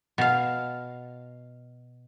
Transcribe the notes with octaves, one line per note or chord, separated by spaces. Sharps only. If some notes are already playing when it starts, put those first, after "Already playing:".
B2 F5